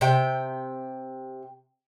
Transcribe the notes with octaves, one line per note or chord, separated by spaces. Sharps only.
C3 G5